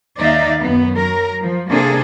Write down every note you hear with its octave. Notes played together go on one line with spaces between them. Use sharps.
D#2 D#4 D5 E5 F5
F#2 B3
F#3 A#4
F3
C3 A#3 D4 G#4 A4